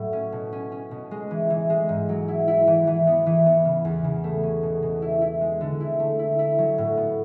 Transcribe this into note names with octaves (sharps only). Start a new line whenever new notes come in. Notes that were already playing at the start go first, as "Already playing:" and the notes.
Already playing: A2 F#3
C#4
B2
C#4
C#4
B2
G#3
E3
E3
G#3
G#2
F#3
E4
E4
E3
E3
B3
E3
B3
C#3
E2
C#3
A3
C#4
B2
B2
E4
E4
G#3
D3
E4
A3
E4
E4
F#3
A2
B3